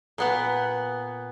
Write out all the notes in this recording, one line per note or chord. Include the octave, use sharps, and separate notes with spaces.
A#2 B3 F#5